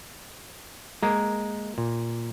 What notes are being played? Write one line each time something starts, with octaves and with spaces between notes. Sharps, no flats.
G#3 A#3
A#2